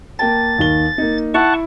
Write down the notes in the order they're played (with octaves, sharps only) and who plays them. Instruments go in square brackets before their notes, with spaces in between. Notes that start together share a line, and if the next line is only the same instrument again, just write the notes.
[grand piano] A#3 G5 A5 [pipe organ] A6
[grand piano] D#2 D#3 G7
A#3 D#4
[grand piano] E4 [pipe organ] F#5 A5 C#6